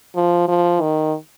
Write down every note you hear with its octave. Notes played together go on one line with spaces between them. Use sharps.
F3
F3
D#3